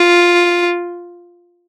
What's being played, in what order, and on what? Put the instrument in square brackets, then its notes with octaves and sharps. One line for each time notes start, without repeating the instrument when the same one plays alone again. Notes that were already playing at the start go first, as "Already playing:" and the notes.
Already playing: [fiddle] F4